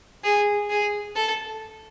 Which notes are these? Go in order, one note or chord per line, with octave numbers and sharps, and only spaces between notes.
G#4
G#4
A4